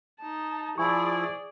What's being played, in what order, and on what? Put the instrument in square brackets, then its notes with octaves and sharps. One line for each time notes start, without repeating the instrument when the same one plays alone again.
[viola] D#4 A5
[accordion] F3 E4 [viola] G#4 D5 [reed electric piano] G#5 C#6